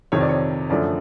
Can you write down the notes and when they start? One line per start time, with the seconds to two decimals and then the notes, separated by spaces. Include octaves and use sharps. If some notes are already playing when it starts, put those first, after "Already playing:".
0.12 F2 C3 D#3 C#5
0.21 D5
0.29 C#5
0.70 F#2 D3 F3 A3 D5